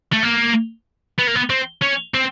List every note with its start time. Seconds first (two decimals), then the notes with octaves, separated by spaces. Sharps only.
0.13 A3
0.23 A#3
1.18 B3
1.27 A#3
1.35 B3
1.50 C4
1.82 C#4
2.14 C4